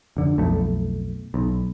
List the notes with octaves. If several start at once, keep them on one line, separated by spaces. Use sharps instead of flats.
F1 D3
B1 F2 A3
B1